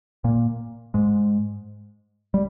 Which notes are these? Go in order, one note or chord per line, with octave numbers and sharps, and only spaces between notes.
A#2 A#3
G#2 G#3
G3